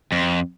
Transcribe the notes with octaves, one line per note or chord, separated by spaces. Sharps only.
F2